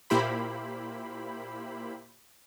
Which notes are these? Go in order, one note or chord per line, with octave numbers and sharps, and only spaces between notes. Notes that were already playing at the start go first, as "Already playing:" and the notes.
A#2 A#3 E4 G4 C5 B5